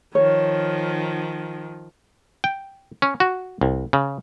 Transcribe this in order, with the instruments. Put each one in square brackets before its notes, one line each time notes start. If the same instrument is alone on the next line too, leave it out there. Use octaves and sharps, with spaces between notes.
[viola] D#3 F3 [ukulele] C#5
[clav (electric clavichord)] G5
C#4
F#4
C2
C#3